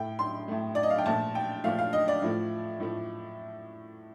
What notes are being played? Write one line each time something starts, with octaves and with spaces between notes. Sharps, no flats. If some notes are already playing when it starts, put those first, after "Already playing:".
Already playing: A2 A3 G5
C6
A2 A3
D5
D#5
F5
G5
A#2 F3 A3 A5
G5
A#2 F3 A3 F5
F5
D#5
D5
A2 F3 A3
A2 F3 A3